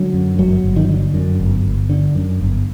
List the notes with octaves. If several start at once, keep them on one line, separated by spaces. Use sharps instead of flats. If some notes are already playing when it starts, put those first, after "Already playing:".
Already playing: D3 F#3
F#2
G1 F#3
G1
D#3
D3
F#2
G1
G1
D3
F#2
G1